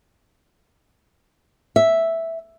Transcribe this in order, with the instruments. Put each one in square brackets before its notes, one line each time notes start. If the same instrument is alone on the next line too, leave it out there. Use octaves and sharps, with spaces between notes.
[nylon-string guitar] E5